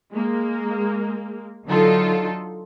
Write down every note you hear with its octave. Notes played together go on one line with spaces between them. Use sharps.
G#3 A#3
D3 F#3 D#4 F4 A4